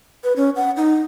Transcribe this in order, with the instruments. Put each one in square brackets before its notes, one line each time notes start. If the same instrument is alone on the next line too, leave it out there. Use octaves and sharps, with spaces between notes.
[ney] B4
C#4
F#5
D#4